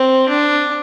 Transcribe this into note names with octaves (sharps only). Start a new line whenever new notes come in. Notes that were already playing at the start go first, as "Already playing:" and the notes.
Already playing: C4
D4